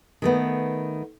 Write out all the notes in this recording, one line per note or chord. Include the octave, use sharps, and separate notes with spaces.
D#3 A3 B3